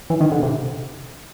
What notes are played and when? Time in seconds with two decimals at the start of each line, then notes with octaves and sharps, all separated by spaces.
0.10 E3
0.21 D#3
0.32 D3
0.39 B2
0.43 C3